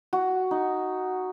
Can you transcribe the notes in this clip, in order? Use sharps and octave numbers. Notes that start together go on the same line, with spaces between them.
F#4
D#4